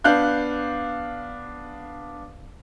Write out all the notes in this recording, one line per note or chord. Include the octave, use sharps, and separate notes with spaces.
B3 D4 F5 F#6 G6